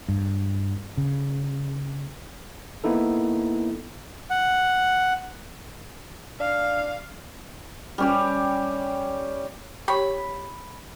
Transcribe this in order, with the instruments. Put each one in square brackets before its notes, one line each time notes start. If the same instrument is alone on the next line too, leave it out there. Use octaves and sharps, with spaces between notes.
[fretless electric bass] G2
C#3
[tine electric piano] A#3 B3 D#4 E4 A4
[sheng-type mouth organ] F#5
[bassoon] D4 [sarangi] F5
[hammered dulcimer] G3 C#4 G4
[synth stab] G4 C#5 [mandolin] B5